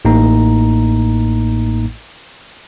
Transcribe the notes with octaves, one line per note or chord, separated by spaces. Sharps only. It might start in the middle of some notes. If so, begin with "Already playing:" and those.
A1 A2 A#3 D#4 A#5